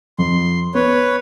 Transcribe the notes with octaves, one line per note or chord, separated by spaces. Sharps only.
F2 C6
B3 B4 C#5